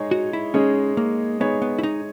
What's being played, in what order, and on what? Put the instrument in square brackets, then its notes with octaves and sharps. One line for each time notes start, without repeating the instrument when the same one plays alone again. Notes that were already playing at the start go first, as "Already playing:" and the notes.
Already playing: [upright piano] G#3 D#4 G#4 C#5
[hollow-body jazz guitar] F#4
E4
[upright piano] G#3 D#4 G#4 C#5 [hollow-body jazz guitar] C#4
[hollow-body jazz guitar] A#3
[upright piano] G#3 D#4 G#4 C#5 [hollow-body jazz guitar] B3
[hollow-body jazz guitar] B3
E4
D#4